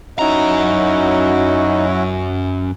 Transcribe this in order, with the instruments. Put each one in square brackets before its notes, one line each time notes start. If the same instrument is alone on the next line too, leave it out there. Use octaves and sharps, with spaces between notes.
[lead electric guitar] F#2 A#5 [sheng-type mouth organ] C#4 E4 F#4 [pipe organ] D#4